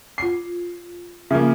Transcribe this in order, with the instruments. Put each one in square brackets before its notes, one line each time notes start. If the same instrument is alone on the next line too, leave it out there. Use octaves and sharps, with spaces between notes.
[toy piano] F4 D6 [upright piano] C7
[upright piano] C#3 F3 A#3 [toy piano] E5 D6